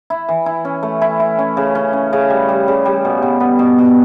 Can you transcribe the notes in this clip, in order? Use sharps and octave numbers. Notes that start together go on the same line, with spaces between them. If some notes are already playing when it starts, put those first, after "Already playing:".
E4
E3
E4
C#4
A3
E4
E4
C#4
C#3
C#4
C#4
C#3
G3
G3
C#3
G3
B2
B2
B3
B2
B2